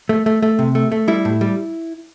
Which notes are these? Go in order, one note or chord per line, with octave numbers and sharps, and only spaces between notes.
A3
A3
A3
C3
A3
A3
G3 E4
A2
G3